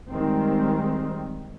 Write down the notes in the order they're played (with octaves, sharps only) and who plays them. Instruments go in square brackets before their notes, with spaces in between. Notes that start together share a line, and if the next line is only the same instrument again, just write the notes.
[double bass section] D#3 G3 G#3 C4